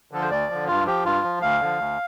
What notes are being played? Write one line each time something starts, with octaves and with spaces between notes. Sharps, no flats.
D3 F3 A4
C5
D2 D5
D3 F3
G2 F4
F3 G4
G2 F4
F3
D2 F5
D3 F3
D2